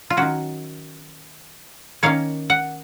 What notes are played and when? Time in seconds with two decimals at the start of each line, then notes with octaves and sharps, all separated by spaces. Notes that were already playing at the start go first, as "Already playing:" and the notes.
0.10 F4
0.17 D#3 F#3 C#4 F#4
2.03 D#3 A#3 C#4 C#5 F5
2.50 F#5